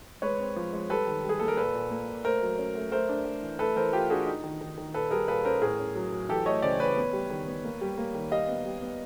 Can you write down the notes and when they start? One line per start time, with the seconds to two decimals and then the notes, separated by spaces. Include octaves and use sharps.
0.22 G#3 B4 C#5
0.39 C4
0.56 F3
0.73 G#3
0.89 G3 A4 B4
1.07 D#3
1.24 G3
1.29 G#4
1.39 A#3 A4
1.48 A#4
1.57 A#2 A4 B4
1.74 A#2
1.90 A#3
2.08 A#2
2.24 A3 A#4 C5
2.42 F#3
2.59 C#4
2.75 A3
2.92 A3 A#4 C5
3.09 D4
3.25 A3
3.43 E3
3.59 A3 A4 B4
3.76 E3 A#4 C5
3.93 E3 F4 G4
4.10 D4 F#4 G#4
4.26 D#4
4.44 D#3
4.61 D#3
4.77 D#3
4.94 A#2 A4 B4
5.11 G3 G#4 A#4
5.28 A#2 A4 B4
5.45 C#4 A#4 C5
5.62 A2 G#4 A#4
5.79 C#4
5.95 F#3
6.12 F#3
6.29 E3 G4 A4
6.46 A3 C#5 D#5
6.62 C#3 C5 D5
6.79 E3 B4 C#5
6.96 B3
7.13 G3
7.30 D#3
7.47 B3
7.64 A#3
7.81 G3
7.98 A#3
8.15 D#3
8.31 G3 D#5 F5
8.48 B3
8.65 G3
8.82 B3